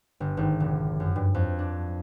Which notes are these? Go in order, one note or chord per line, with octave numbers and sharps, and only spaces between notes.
G1
G#1
F1
F#2
G2
F2
D4